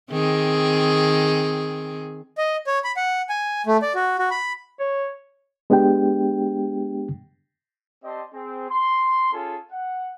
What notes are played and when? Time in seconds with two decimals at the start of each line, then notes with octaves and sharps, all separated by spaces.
0.11 D#3 C4 G#4
2.38 D#5
2.67 C#5
2.84 B5
2.97 F#5
3.29 G#5
3.66 A3
3.82 D5
3.95 F#4
4.19 F#4
4.31 B5
4.80 C#5
5.70 G#3 B3 D4 G4 G5
8.04 C4 G4 D5 D#5 A5 C6
8.34 C4 G#4
8.70 C6
9.33 C#4 F4 G#4 A4 G#5
9.71 F#5